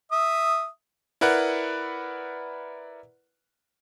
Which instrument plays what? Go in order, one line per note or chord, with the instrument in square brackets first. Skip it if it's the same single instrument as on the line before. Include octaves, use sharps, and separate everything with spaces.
[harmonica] E5 D#6
[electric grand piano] E4 A#4 B4 D5 F#5